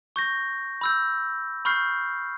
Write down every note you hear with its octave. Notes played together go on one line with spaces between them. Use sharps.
C#6 G6 A#6
B5 E6 G6
B5 C#6 F6 G6 C7